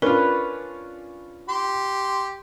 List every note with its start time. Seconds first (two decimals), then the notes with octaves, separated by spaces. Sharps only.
0.02 C#4 D4 F4 A#4 B4
1.48 G4 C6